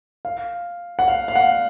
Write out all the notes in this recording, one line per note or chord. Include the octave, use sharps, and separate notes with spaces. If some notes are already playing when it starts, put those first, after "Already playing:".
F5
F#5
F5
F5
F#5